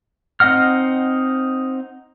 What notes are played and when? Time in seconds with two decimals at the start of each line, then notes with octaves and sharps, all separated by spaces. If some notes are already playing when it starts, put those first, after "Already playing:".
0.40 C4 D#4 D#5 F#5 F6